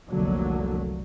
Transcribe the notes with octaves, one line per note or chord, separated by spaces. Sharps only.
F1 C2 D3 F#3 A#3